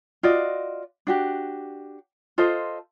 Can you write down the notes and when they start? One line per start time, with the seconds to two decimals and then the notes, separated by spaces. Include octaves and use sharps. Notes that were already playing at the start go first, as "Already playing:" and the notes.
0.23 F4 F#4 D5 D#5
1.07 D4 F#4 G4
2.38 F4 A4 C5 D#5